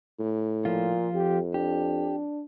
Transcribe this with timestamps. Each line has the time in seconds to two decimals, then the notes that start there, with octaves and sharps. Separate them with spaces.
0.19 A2
0.65 A#2 F3 F4
1.14 F2 G4
1.54 D4 G4